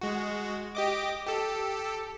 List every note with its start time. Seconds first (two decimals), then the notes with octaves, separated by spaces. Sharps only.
0.01 G#3 F#4
0.75 G4 D#5 D6
1.27 G4 A4